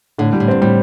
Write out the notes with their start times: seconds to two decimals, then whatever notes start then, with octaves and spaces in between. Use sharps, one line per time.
0.18 A2 D3
0.33 G3
0.40 A2
0.48 G2 C4
0.61 A2 G3